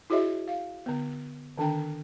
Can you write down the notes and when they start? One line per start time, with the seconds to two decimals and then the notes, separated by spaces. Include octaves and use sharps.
0.10 E4 F#4 G#4 C#5 D#5 E5
0.48 F5
0.86 D3 B3
1.58 D3 D#3 D4 G5